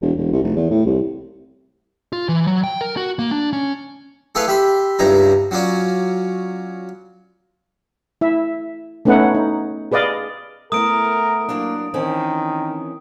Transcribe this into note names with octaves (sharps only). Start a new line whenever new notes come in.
E1
E1
C2
F1
E2
A2
C2
F4
E3
F#3
G5
A#4
F#4
A#3
D4
C#4
A3 E4 G#4 A4 B4 F5
G4 E5 B5 C6
C#2 G2 C#3 D#4 E4 A#5
F#3 C#4 F4 D5
E4 E5
A3 B3 C#4 D#4 B4 F#5
D#4
G#4 B4 D5 D#5 F5
A3 B3 E4 A#4 D#6 D7
F#3 A#3 D4
D#3 E3 C4 C#4